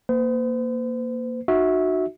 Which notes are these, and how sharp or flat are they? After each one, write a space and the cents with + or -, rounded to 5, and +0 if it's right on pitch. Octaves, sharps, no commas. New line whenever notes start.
A#3 +0 C5 -45
D#4 -20 F#4 -10 E5 -20